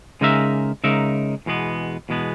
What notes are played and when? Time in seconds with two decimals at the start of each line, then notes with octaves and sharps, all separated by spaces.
0.21 C#3 G#3 D#4 A#4 E5
0.84 C#3 G#3 D#4 A#4 E5
1.46 E2 B2 G#3 B3
2.09 E2 B2 G#3 B3